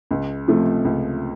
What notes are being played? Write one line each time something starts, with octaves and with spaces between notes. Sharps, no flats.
C#2
C3 F3 A3
C#2